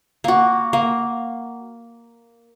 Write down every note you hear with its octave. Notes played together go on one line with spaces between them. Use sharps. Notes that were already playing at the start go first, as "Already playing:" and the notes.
A#3 F#4
A#3